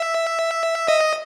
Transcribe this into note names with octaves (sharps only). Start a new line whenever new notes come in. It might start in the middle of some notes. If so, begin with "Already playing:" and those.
Already playing: E5
D#5